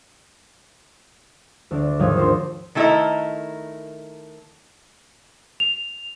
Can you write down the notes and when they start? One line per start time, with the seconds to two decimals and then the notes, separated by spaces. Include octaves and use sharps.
1.71 D2 D4 D5
1.99 D#2 G#2 F3 D#6 G#6
2.17 D4 A#4 C5
2.75 D#3 A3 E4 G4 A#4 D#5
5.60 F7